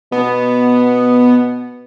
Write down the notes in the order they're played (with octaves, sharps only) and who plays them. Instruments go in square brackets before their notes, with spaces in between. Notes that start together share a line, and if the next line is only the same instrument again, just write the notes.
[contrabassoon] B2 [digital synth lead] B3